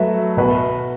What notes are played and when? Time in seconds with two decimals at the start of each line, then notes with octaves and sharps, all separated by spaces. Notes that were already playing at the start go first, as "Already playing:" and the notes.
Already playing: F#3 A3 F#4 B4 E5
0.37 B2 B3 F#4 B4